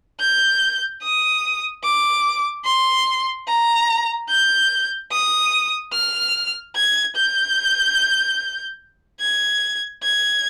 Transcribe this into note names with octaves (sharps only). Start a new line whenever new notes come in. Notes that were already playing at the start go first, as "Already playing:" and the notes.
G6
D#6
D6
C6
A#5
G6
D#6
F6
G#6
G6
G#6
G#6